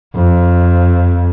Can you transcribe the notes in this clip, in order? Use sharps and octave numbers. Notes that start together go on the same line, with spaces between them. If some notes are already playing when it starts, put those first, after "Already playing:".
F2